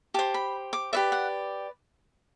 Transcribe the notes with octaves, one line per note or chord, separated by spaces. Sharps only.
G4 C5 A5
B5
D6
G4 B4 D5 E5
F#5